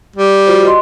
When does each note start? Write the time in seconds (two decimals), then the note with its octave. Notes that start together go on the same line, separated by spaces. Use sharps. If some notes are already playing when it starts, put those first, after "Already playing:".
0.16 G3
0.47 F4 F#4 C5
0.65 D#5 C6